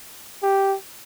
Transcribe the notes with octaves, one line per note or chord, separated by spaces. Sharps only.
G4